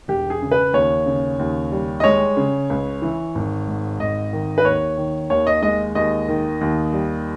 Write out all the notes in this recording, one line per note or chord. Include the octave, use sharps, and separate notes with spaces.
E1 G4
G#4
C#3
B4
D#2 C#5
C#3
D#2
G3
D#5
G#3 C#5
C#3
C#2
E3
G#1
G#2
G#1 D#5
D#3
B4
D#2 C#5
D#3
D#2 C#5
D#5
G#3 D#5
D#2 D#5
D#3
D#2
G3